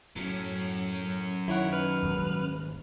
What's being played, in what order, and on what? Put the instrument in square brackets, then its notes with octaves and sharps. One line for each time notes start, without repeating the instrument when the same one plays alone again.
[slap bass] A2 [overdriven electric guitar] F#3 C#4
[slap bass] D#3 [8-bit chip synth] E4 C#5 F#5
[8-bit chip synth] B4 F6
[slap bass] D#1 G#1